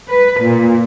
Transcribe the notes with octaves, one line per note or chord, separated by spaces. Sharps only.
B4
A#2